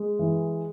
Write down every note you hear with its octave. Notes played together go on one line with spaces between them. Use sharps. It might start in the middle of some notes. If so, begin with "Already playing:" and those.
Already playing: G#3
E3